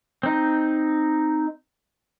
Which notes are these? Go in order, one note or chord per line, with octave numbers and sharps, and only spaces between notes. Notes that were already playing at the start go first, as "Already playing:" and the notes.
C4 D#4